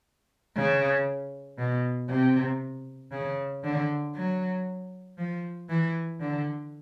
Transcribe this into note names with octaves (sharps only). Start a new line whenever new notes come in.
C#3
B2
C3
C#3
D3
F#3
F3
E3
D3